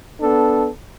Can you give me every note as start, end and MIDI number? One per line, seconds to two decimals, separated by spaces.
0.19 0.67 59
0.19 0.67 62
0.19 0.67 69